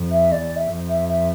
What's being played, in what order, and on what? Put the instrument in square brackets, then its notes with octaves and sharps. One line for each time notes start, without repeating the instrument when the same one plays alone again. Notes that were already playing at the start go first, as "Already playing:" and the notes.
Already playing: [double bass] F2
[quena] E5
[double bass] E2 [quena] D5
[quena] D5
E5
[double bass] F2
[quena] E5
E5